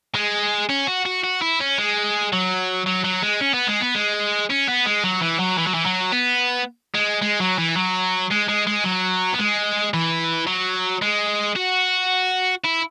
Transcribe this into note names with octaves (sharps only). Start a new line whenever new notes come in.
G#3
C#4
F#4
F#4
F#4
E4
C#4
G#3
F#3
F#3
F#3
G#3
C#4
B3
G#3
B3
G#3
C#4
B3
G#3
F#3
E3
F#3
E3
F#3
E3
F#3
B3
G#3
G#3
F#3
E3
F#3
G#3
G#3
G#3
F#3
B3
G#3
E3
F#3
G#3
F#4
E4